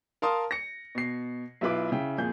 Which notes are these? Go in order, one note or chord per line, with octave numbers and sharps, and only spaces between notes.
A#4 F5 A5 C6 D#6
A#6 C#7
B2 C7
B1 E4 F4 B4 B5 D6
C#3 E4 G5
F2 A#2 G#4 G6